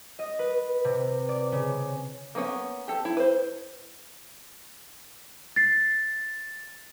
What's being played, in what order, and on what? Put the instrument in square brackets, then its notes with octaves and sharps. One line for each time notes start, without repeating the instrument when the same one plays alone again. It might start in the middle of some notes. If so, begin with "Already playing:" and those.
[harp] D#5
B4
C3
D5
C#3
[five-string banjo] A#3 B3 C#4 F#5
G4 A4
E4
B4 C5
[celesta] A6 C7